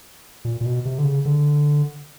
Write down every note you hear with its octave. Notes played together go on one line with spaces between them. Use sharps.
A#2
A#2
B2
C3
D3
C#3
D3